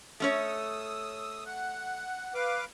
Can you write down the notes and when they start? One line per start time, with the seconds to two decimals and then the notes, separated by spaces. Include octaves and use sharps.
0.20 A3 C#4 C#5 D#6 E6
1.46 F#5
2.34 B4 F5 D6